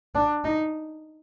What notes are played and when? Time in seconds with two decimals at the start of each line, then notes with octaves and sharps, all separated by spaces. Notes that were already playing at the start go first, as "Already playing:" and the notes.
0.15 D4
0.45 D#4